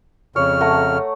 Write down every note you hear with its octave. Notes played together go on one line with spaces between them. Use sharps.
F2 C#3 C#5 F6
A3 F#5 A#5